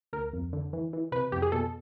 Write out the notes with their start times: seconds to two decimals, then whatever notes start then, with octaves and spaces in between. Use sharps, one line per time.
0.13 D2 A#4
0.33 F2
0.53 D3
0.73 E3
0.93 E3
1.12 C3 B4
1.32 F2 G4
1.42 G#4
1.52 B2 A4